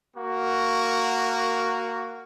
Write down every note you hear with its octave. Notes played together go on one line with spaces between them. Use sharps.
A#3 F#4